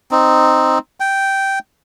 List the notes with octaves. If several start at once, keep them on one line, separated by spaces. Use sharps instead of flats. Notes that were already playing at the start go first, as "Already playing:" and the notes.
C4 D#4
G5